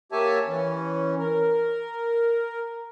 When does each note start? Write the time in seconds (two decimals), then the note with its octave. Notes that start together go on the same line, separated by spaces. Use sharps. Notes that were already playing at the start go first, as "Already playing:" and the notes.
0.12 A#3 G4 C#5 E5 G#5 A5
0.48 E3 C#4
1.18 A#4